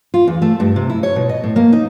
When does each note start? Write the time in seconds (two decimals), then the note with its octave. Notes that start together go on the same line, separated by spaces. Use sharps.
0.14 F4
0.28 E2
0.42 A3
0.60 G2
0.76 C3
0.89 E4
1.03 C#5
1.16 B2
1.29 D#5
1.44 A2
1.56 A#3
1.72 D#4